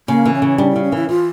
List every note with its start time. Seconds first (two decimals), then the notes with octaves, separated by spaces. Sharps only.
0.08 C#3 A#3
0.25 E3
0.34 C#4
0.42 C#3
0.58 G3 D4
0.71 E4
0.76 C#3
0.83 C#4
0.92 E3 E4
1.09 E3 F4